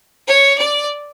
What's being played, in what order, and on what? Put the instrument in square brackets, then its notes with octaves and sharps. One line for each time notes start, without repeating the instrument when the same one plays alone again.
[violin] C#5
D5